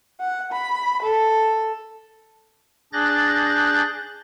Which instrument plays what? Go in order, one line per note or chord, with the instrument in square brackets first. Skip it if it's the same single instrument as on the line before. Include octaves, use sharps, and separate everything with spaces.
[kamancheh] F#5
B5
A4
[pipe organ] D4 G#4 F#6 G6 A6 A#6